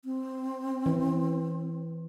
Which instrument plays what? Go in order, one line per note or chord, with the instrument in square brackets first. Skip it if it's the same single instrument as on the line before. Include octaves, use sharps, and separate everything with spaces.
[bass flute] C4
[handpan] E3